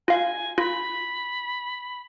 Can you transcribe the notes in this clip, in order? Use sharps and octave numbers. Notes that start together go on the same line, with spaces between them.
F4 F5 G#5
F4 B5